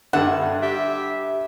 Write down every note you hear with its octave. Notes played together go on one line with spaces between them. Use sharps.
G2 D3 E5 F#5
G4 E5